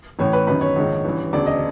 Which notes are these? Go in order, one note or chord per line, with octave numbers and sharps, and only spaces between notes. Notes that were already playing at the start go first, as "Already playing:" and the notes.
A1 A2 E3 C#5
B4
G1 F#2 D#3 B4
C#5
A#1 G#2 D#3
A1 G2 E3
E1 D2 C#3 D5
D#5